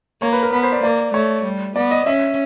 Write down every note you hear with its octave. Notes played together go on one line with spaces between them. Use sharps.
A#3 C#5
B4
A#4
B3 B4
C5
D5
A#3 D5
A3 C#5
G3
B3 D5
D#5
C#4 E5